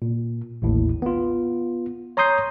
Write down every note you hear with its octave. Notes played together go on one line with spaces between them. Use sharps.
A#2
A1 D#2 A2
B3 F4
C#5 A#5 C6 D#6 G6 C7